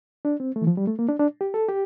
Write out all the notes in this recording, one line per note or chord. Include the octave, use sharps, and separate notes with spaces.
D4
C4
A3
E3
F3
G3
A3
A#3
D4
D4
G4
A4
G4